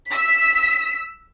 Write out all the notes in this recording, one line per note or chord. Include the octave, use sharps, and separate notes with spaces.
E6 B6